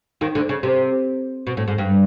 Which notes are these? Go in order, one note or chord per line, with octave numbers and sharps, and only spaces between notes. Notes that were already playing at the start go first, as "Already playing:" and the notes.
D#2 D#3
D2 D3
C#3
C3
B2
A2
G#2
G2